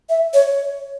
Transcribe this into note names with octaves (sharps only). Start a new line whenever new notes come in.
E5
C#5